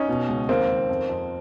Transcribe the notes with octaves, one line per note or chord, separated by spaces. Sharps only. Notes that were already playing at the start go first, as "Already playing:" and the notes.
Already playing: C#4 D#4
B2
C#2
D#2 A#3 C4
D#2
F2
F2